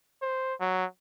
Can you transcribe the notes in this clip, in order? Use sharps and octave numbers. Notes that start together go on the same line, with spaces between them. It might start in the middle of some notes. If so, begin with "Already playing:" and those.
C5
F#3